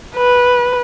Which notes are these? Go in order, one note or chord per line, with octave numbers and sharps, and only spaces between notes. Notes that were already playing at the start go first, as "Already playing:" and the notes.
B4